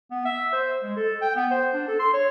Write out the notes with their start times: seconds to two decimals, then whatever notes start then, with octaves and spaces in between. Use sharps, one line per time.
0.11 B3
0.25 E5
0.53 C5
0.83 G#3
0.96 A4
1.22 G5
1.35 B3
1.51 C5
1.74 D4
1.88 A4
2.00 C6
2.13 C#5